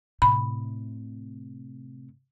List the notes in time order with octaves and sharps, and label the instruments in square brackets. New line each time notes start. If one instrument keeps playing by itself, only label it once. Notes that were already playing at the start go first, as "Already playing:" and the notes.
[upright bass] A2 C3 [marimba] B5